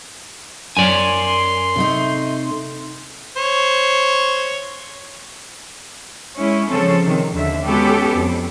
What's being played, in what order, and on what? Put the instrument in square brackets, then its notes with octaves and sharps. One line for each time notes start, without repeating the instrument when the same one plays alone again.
[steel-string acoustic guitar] F#2 [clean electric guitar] C#5 D5 G#5 [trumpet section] C6
[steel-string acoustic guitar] C3 A3 D#4
[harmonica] C5 C#5
[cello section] G#3 C#4 E4
C#3 F3 C4 C#4 A4
C3 D#3
D#2 D3 E5
G#3 B3 C#4 F#4 G4 A4
F2